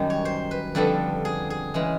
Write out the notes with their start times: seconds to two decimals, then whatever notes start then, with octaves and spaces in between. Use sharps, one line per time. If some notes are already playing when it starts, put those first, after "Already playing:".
Already playing: F#2 D#3 G3
0.10 C#5
0.25 C5
0.51 B4
0.75 F2 D3 G3 B3 A4
1.25 G#4
1.50 G#4
1.74 C#3 E3 G#3